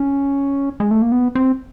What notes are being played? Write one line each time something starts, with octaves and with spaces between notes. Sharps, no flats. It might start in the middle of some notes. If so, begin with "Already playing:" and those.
Already playing: C#4
G#3
A3
A#3
B3
C4